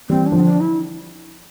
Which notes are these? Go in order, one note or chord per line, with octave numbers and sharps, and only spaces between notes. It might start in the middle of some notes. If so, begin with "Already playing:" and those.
E3 G3 C4
D4
D3 F3
C4
D4
E4